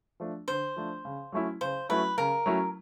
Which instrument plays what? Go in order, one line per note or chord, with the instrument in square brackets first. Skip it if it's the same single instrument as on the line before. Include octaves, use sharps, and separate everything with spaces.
[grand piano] F3 A3 D4
[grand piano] D3 [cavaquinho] C5
[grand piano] F3 A3 D4
C#3
F#3 A3 C#4 E4
[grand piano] C#3 [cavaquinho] C5
[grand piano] F#3 A3 C#4 E4 [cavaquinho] B4
[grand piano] C#3 [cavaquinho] A#4
[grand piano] F#3 A3 C#4 E4